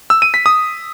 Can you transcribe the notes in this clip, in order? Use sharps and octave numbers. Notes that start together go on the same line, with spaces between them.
E6
D#7
B6
D#6